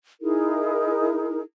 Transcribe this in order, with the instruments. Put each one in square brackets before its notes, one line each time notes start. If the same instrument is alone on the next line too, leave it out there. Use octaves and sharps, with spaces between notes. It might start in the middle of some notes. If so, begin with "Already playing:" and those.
[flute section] D#4 E4 G#4 A#4